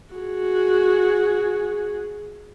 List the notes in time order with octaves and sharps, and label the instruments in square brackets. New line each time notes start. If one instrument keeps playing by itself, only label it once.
[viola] F#4 G#4